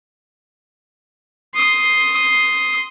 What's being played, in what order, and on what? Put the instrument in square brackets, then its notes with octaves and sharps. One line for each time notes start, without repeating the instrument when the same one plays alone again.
[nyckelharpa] C6 D#6